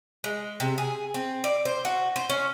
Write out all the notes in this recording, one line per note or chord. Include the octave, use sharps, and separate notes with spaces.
G#3
C3
G#4
C4
D5
C5
F#4
C5
C#4